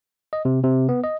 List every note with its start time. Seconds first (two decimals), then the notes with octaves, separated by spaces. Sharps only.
0.33 D#5
0.45 C3
0.63 C3
0.89 B3
1.04 D#5